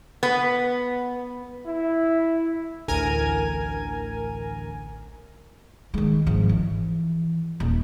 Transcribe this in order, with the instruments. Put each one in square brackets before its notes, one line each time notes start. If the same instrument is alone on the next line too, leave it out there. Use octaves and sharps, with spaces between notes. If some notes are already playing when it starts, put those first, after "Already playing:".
[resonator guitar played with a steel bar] B3
[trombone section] E4
[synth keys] A1 D2 A#4 G#5
[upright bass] D#3 G#3
G#1 F3
E3
D#1